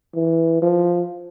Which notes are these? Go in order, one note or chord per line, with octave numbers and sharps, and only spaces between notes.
E3
F3